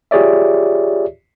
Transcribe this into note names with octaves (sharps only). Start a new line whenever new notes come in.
F4 G4 G#4 C#5 D5 E5